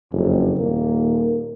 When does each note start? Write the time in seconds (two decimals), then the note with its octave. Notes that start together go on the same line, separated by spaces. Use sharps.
0.13 F#1 F2
0.58 D#1 A#3